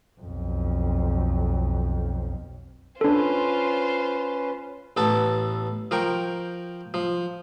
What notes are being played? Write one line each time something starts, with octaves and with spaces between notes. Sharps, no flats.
B1 F2
C#4 D4 F4 A4 B4 C5
A1 B3 A4 A5
F3 A#4 G5 C#6
F3